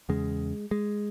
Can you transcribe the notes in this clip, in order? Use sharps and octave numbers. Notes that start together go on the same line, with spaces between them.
E2 C#3 G#3
G#3